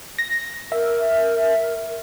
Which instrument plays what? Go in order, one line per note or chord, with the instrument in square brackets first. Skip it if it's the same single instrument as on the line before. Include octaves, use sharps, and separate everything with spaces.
[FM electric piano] A#6
[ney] A#4 [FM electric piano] E5